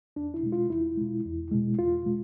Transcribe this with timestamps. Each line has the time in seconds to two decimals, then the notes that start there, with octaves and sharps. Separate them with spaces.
0.16 E2 D4
0.34 E4
0.43 B2 G#3
0.52 F4
0.70 E2 E4
0.97 B2 G#3
1.25 E2
1.52 B2 G#3
1.79 E2 F4
2.06 B2 G#3